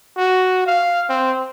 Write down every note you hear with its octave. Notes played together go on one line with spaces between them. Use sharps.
F#4
F5
C4